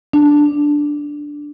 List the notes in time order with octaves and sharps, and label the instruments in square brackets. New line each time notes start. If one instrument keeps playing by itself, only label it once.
[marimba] D4